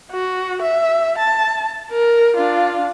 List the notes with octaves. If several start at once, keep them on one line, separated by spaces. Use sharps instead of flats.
F#4
E5
A5
A#4
D4 F4